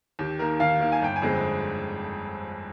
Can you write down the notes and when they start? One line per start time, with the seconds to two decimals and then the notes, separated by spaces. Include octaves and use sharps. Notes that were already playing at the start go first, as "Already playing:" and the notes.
0.19 D#2 G4
0.39 D#3 A#3 A#4
0.60 D#2 F5
0.80 D#3 A#3
0.92 G#5
1.01 G1 G5
1.16 G#5
1.22 F2 D3 G#3 C4